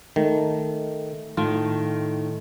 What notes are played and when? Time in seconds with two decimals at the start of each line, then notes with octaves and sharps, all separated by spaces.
0.16 D#3 A3
1.37 A2 D#3 F4